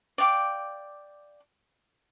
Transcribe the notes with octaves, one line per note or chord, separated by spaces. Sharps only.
D5 F5 G5 D6